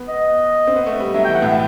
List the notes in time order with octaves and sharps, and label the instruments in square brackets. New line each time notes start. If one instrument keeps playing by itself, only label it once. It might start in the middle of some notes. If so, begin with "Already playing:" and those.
Already playing: [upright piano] B3
[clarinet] D#5
[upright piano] C4
B3
A3
G3
[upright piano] F#3 [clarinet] E5
[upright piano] E3 [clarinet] G5
[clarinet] F#5
[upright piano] A2 [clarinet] E5